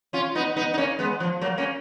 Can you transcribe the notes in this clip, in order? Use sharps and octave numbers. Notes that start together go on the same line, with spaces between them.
C#4 F4
B3 D#4
B3 D#4
D#4
A#3 C#4
G#3 B3
F3
F#3 A#3
A#3 C#4